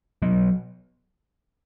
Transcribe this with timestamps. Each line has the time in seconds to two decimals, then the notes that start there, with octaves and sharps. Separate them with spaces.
0.22 F#3 B3